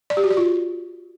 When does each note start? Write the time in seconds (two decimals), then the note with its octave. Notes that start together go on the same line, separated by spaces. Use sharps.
0.10 D5
0.17 G4
0.24 F#4
0.30 D5
0.37 F4